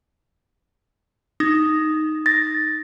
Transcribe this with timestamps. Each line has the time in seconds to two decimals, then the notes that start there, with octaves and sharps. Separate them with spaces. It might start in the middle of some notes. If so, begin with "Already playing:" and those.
1.40 D#4
2.26 A6 A#6